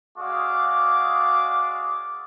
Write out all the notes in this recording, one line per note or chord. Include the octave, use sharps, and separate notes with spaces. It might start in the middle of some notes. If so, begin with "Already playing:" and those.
G#3 F#4 D5 F5 D6 D#6